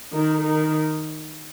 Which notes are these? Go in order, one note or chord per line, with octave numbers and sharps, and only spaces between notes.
D#3
D#3